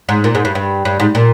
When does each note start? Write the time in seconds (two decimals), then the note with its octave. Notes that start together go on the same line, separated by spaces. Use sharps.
0.09 G#2
0.24 A#2
0.35 G#2
0.45 G2
0.55 G2
0.85 G2
1.00 G#2
1.15 A#2